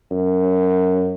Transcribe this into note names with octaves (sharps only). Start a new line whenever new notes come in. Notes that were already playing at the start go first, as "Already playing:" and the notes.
F#2